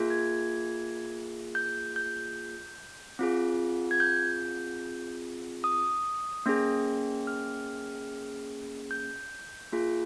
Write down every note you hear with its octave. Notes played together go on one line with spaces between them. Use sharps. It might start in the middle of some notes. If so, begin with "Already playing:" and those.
Already playing: A#3 F4 G#4
G#6
G6
G6
C4 F4 G#4
G#6
G6
D#6
A#3 C#4 G#4
F6
G6
A#3 F4 G#4